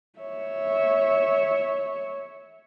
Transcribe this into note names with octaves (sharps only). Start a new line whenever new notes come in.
C#5 E5